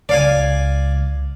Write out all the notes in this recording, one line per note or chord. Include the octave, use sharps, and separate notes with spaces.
C#2 D5 F5 G#5